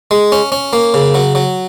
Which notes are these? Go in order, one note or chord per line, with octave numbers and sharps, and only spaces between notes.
G#3
C#4
C#4
A#3
C#3
F#3
F#3